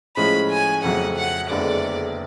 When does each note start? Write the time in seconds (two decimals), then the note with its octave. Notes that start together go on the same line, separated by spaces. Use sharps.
0.16 A2 F3 G#3 C#4 B5
0.51 G#5
0.83 F2 C#3 F#3 A3 F#5
1.17 F#5
1.50 F#1 F2 D3 G#3 B3 D5